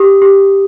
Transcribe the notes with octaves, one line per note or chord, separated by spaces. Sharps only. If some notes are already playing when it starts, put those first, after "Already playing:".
Already playing: G4 D#6
G4